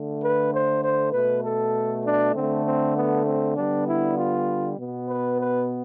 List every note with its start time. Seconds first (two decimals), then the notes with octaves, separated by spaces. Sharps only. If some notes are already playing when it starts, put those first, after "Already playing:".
Already playing: D3 A3
0.21 B4
0.52 C5
0.82 C5
1.12 B2 A3 B4
1.43 A4
2.04 D4
2.34 D3 A3 C4
2.64 C4
2.95 B3
3.26 C4
3.56 D3 G3 B3 D4
3.87 E4
4.17 F4
4.77 B2 B3
5.08 B4
5.39 B4